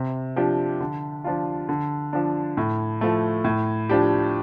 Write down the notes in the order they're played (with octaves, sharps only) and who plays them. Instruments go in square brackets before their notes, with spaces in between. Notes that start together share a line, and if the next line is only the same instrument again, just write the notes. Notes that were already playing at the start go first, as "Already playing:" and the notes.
Already playing: [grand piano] C3
F3 D4 G4
D3
F3 D4 F4
D3
F3 D4
A2
F3 A3
A2
F3 D4 G4